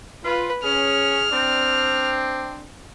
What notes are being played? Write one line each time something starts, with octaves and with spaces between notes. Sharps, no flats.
F4 B4
C#4 G#4 F6
C4 D4